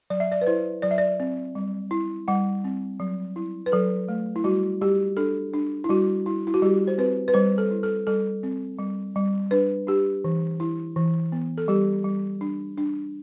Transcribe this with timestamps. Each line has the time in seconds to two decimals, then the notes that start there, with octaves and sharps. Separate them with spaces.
0.10 F#3 D5
0.20 E5
0.32 D5
0.41 B4
0.46 E4 C5
0.82 F#3 D5
0.91 E5
0.98 D5
1.20 C4
1.55 G3
1.91 E4
2.28 G3 F#5
2.64 C4
3.00 F#3
3.36 E4
3.66 B4
3.72 F#3 A4
4.08 A3
4.36 E4
4.44 G3 F#4
4.81 G3 G4
5.17 D4 A4
5.53 D4
5.84 E4
5.89 G3 F#4
6.26 E4
6.47 E4
6.54 F#4
6.62 G3 G4
6.87 C5
6.98 C4 B4
7.28 B4
7.34 G3 C5
7.58 A4
7.71 E4
7.83 A4
8.07 G3 A4
8.43 C4
8.79 G3
9.16 G3
9.51 D4 B4
9.87 D4 G4
10.24 E3
10.60 E4
10.96 E3
11.32 B3
11.58 A4
11.68 G3 G4
12.04 G3
12.41 D4
12.78 D4